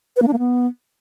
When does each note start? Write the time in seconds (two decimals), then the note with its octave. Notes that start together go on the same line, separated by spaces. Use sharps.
0.16 B4
0.22 A#3
0.28 D4
0.33 A#3
0.39 B3